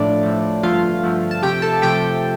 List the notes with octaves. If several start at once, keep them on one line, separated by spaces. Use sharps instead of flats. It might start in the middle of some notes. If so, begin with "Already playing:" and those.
Already playing: A2 F3 A3 D4 D5
A2 F3 A3
G2 D3 F3 A3 F4 F5
G2 D3 F3 A3
A5
C3 F3 A3 G4 G5
A4 A5
C3 F3 A3 G4 G5